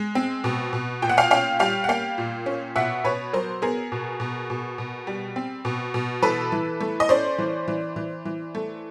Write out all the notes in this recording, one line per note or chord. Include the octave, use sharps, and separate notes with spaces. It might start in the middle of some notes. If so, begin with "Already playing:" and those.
Already playing: G#3
C4
B2
B2
A#2 G5
F#5
F5 G5
C#4 F5 G5
G3 F5 G5
F#5
A#3 F5 G5
A#2
C#4
B2 E5 F#5
B2 B4 C#5
F#3 A#4 C5
B3 G#4 A#4
B2
B2
B2
B2
G3
C4
B2
B2
E3 A4 B4
E3
A3
D#5
C#4 C5 D5
E3
E3
E3
E3
A3